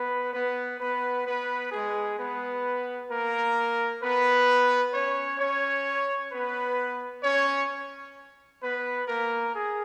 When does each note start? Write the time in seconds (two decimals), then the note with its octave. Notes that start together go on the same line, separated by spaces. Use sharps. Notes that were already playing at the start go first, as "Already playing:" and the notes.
Already playing: B3 B4
0.34 B3 B4
0.80 B3 B4
1.26 B3 B4
1.72 G#3 G#4
2.18 B3 B4
3.10 A#3 A#4
4.03 B3 B4
4.94 C#4 C#5
5.40 C#4 C#5
6.32 B3 B4
7.24 C#4 C#5
8.62 B3 B4
9.08 A#3 A#4
9.54 G#4